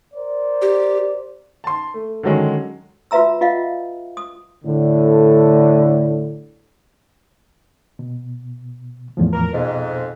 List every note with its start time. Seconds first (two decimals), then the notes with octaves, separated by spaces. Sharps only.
0.14 A#4 C5 D5
0.62 G4
1.64 A5 C6
1.94 A3
2.23 D3 D#3 F#3 G#3 C#4
3.11 F4 F#4 B4 E5 A#5 E6
3.41 F4 D#5 F5 F#5
4.17 D#6
4.65 A2 D3
7.99 B2
9.17 E2 A2 F3
9.33 A#4
9.53 F2 G#2 B2